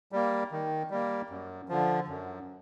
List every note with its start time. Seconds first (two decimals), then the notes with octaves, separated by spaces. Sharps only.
0.12 G3 A#3
0.52 D#3
0.90 G3 A#3
1.30 F#2
1.69 D3 F3
2.08 F#2